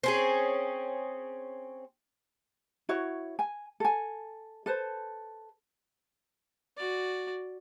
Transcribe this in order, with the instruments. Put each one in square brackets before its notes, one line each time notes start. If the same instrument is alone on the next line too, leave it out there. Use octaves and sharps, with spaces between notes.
[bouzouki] C4 C#4 G#4
[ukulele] E4 F#4 C#5
G#5
A4 G#5
A4 B4 C5
[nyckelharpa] F#4 D5